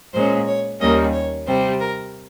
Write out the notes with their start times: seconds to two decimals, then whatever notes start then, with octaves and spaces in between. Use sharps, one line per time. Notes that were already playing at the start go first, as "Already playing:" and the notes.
0.14 A#2 G#3 C#4 C5
0.47 C#5
0.80 D#2 D#3 G3 A#3 C#4 D#5
1.13 C#5
1.47 C3 G3 C4 C5
1.80 A#4